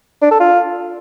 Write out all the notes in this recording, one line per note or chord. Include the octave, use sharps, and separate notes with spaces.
D4
A4
F4